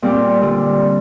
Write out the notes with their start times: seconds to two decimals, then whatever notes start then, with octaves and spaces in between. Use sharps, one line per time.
0.02 A#2 G3 C4 G4
0.42 D3 G3